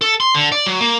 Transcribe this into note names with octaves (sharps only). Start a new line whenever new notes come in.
A4
C6
D3
D5
F#3
A#3